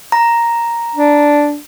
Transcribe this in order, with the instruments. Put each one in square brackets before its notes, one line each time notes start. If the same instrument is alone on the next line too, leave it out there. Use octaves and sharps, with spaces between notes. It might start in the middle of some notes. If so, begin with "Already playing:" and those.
[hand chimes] A#5
[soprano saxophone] D4